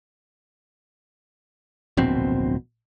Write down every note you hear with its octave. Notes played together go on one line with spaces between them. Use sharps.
D1 A#1 B2 C4